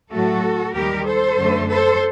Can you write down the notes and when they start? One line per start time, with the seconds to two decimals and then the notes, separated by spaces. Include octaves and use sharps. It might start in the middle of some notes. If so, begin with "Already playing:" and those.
0.12 A2 F#3 A3 F#4 A4
0.75 D#2 D#3 G3 G4 A#4
1.07 A4 C5
1.38 F#2 D3 A3
1.69 A4 C5